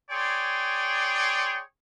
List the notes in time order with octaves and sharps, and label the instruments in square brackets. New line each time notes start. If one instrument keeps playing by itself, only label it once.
[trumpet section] G#4 C#5 D5 G5 C6